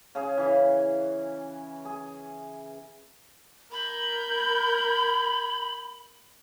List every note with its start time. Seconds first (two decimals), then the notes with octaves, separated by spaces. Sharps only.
0.15 C#3 G#4
0.37 C#3 E3
1.85 G#4
3.72 A#4 B5 G6 G#6